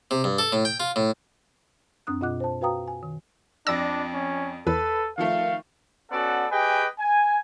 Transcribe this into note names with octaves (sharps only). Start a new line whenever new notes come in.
C3
G2
A4
A2
G5
F4
A2
F#2 C4 D4 D#6 F#6
B2 F4 D#5 F#5 D6 F#6
C5 A5
F#4 B4 F5 G5 A#5 D#6
G#5
D#3
F2 D4 D5 E6 A#6
C#4
E2 A4 B4
D#3 F3 A3 F5
B3 C#4 F#4 A4 D5 F#5
G4 G#4 B4 D#5 G5 G#5
G#5